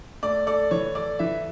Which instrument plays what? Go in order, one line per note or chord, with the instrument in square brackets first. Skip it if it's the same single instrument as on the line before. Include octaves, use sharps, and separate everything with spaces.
[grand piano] A3 [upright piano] D5
[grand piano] A4 [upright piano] D5
[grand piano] E3 [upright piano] C#5
[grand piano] A4 [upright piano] D5
[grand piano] E3 [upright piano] E5